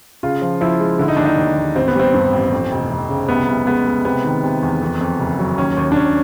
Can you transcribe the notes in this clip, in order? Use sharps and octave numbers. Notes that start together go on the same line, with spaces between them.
C#3 F4
F3
F3 E4
G#3
D3 E4
D#4
D#2 D4
D#4
D#2
D#2
A1 C4
B3
G3 C4
G2
A1
F2
F1
F1
C#3
C2 B3
C2
G#3 B3
G#3
C3 B3
D#3
C3
E2
F2
F2
F#1
F#3
D#2 C#4
D#2
D4
D#2 C#4